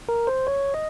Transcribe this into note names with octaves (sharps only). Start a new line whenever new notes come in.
A#4
C5
C#5
D#5